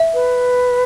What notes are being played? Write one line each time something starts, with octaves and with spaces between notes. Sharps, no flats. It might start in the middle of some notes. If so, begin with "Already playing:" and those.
Already playing: E5
B4